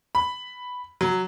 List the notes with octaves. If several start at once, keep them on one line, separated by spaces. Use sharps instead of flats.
B5
F#3